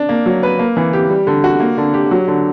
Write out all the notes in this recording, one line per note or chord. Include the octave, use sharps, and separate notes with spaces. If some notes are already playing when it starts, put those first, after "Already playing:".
Already playing: D4
A#3
F#3
B4
A#3
E3
G4
G3
D3
F#4
A#3
D3
G4
F#3
D3